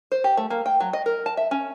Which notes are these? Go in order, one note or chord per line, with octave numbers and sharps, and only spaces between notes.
C5
G4
A3
A#3
G5
F#3
D#5
A#4
A5
E5
C#4